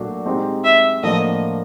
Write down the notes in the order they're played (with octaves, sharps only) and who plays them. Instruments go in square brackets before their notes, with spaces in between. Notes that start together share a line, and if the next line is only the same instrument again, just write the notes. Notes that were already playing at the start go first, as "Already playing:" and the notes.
Already playing: [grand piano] A#2 F#3 A3 D4 F#4
G#3 C4 D#4 G4
[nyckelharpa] E5
[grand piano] A2 F3 A#3 D4 F#4 [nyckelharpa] D#5